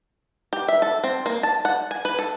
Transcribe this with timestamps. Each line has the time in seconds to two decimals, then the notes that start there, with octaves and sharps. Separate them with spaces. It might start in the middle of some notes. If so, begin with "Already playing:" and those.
0.53 G4
0.68 E5
0.82 A4
1.04 C4
1.26 A#3
1.43 A5
1.65 F#5
1.91 G#5
2.05 B4
2.19 A4